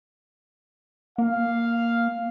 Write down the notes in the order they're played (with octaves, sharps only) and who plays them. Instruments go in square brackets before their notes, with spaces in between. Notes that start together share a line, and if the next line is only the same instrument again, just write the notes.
[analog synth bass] A#3 [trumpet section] F5